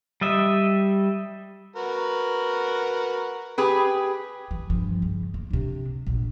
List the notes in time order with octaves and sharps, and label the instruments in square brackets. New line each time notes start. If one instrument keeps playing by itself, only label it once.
[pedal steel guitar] G3 D#5 E5
[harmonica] F#4 A#4 B4
[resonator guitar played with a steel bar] G4 G#4 B4
[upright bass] E3
G2 F3
C#3
A#3
C3 D4
A#1